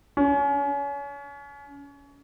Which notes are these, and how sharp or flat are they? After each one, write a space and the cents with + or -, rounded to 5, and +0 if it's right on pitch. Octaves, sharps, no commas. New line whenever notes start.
C#4 +30